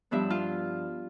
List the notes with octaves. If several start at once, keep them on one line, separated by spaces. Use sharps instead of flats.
G2 F3 B3 D4 E5
F4